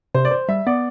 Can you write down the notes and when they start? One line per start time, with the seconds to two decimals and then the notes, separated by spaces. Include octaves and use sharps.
0.14 C3 C5
0.25 D5
0.31 C5
0.49 G3 E5
0.67 B3 D5